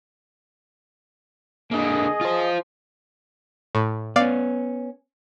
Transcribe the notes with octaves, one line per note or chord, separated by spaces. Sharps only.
D3 A#3 G#4 D#5 D#6
F4 C5
A2
B3 C#4 D5 F5